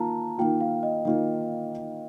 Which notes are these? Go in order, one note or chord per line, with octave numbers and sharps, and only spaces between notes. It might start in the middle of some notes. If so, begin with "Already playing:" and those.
Already playing: D#3 A#3 F4 A5 A#5
D#3 A#3 F4 G5
F5
D#5
D#3 A#3 F4